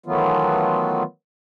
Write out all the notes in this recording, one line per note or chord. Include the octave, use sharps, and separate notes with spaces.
D#3 E3 F#3 A3 B3 F4